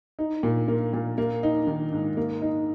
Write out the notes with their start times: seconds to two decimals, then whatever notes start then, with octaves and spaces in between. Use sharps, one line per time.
0.19 D#4
0.43 A#2
0.68 A#3
0.93 A#2
1.18 A#3
1.43 D#4
1.67 D#3
1.92 G#2
2.17 A#3
2.42 D#4